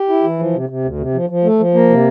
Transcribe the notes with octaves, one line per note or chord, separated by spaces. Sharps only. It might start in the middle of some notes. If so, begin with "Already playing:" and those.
Already playing: G4
E4
E3
F3
C3
C3
D2
C3
F3
F3
A3
F3
A#3
C3